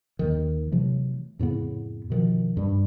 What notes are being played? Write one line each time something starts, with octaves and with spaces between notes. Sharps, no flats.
D#2 D#3
C3 E3 F#3 A3
F2 A2 C#3 B3
B2 D#3 F3
G2 G3